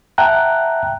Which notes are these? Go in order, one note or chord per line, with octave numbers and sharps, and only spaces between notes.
E5 F#5 G5 A5 A#5 F#6